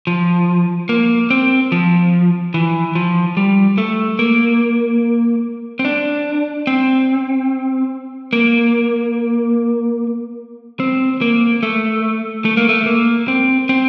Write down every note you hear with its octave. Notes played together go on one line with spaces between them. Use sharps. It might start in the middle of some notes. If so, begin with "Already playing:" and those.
F3
A#3
C4
F3
E3
F3
G3
A3
A#3
C4
D4
C4
A#3
C4
A#3
A3
A3
A#3
A3
A#3
C4
C4